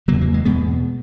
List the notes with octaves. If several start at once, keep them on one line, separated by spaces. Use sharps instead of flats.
C#3 F#3 A#3
E2
F#3 A#3
E3 G#3
E2 B2 G#3 B3